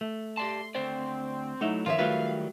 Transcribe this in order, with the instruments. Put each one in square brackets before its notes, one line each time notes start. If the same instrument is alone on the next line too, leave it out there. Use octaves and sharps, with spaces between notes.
[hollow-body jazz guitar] A3
[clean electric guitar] G4 D5 A5 [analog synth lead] C6
[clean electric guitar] D2 C5 D5 [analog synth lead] C4
[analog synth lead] F#3 [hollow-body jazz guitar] A3 D#4 E4
[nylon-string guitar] D#3 C#5 E5 [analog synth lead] F3 [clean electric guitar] F4
[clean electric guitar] F#3 G3 [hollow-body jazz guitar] A3 F4 B4 [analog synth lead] F5